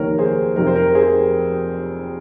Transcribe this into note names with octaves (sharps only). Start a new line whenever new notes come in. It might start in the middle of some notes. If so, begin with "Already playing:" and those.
Already playing: F1 D#2 D#3 A#4 C#5
G#4 C5
F1 F2 C3 A#4
C5
A#4
G#4 C5